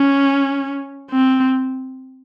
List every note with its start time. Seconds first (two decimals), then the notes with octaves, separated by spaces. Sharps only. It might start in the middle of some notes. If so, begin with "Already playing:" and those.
Already playing: C#4
1.12 C4